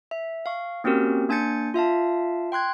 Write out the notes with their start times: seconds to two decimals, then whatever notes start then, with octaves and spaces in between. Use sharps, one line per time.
0.11 E5
0.46 F5 C#6
0.84 A#3 C4 C#4 F#4 G4 A#4
1.29 A#3 D4 G#5 G6 A6 C#7
1.74 F4 E5 F5 A5
2.52 G5 C6 F#6 G#6